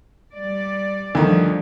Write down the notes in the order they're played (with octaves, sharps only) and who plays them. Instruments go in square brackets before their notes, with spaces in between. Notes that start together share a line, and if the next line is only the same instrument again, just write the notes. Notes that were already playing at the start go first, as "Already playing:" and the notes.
[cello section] G3 D5
[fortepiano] D2 D#3 [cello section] D3 F3 G3